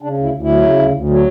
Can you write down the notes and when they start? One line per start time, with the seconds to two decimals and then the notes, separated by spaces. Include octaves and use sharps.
0.02 C#3 D4
0.18 D2
0.23 E4
0.33 D2
0.42 E4
0.49 F#3
0.63 C#3
0.78 D2
0.93 D2
1.09 F#3